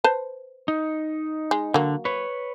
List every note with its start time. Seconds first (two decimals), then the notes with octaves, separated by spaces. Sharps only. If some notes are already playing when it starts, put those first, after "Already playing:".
0.04 B4 C5 A5
0.68 D#4
1.51 G#3
1.74 D3 F#3 A#3
2.05 B4 C#5